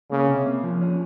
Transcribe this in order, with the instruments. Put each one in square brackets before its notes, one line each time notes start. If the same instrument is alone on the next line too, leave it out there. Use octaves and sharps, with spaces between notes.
[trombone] C#3 [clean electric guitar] A#3
[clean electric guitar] C3
A#3
F3
C#4